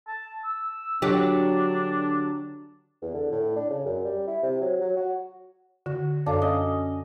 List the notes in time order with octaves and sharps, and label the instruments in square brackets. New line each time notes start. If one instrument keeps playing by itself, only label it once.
[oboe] A5
E6
[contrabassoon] D3 [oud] F#3 G4 [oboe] D4
[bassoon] E2
D3
A2
D4
C#3
F#2
G3
E4
C3
F#3
F#3
F#4
[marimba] D3 [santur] F#4
[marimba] F#2 A4 C#5 [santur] D4 [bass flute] F5
[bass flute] C#4 [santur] D#5